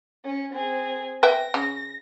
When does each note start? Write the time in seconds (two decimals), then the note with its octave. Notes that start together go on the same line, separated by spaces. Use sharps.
0.24 C#4
0.54 C4 G#4
1.23 B4 E5 G5 A#6
1.54 C#3